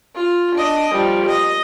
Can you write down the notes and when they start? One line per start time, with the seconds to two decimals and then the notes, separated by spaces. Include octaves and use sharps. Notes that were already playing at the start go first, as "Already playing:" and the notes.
0.16 F4
0.56 D4 D#5
0.95 F3 G3
1.26 D#5